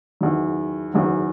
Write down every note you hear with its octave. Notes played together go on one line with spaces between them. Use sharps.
F#1 E2 D#3 F#3
F#1 E2 D#3 F#3